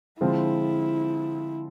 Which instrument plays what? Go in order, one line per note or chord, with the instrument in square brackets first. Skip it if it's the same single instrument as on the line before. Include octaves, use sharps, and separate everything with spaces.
[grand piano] D3 F3 G#3 C4 F4 [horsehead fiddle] E4